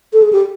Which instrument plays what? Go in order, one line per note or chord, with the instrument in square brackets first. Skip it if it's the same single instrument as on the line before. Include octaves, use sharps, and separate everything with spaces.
[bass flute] A4
G#4
G4